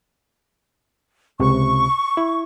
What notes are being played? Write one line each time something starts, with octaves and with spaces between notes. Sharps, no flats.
C#2 C3 C#6
E4